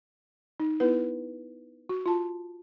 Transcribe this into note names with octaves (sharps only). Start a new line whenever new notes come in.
D#4
B3 E4 B4
F#4
F4 A5